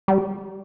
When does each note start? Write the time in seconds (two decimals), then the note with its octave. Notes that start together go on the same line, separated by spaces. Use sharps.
0.08 G3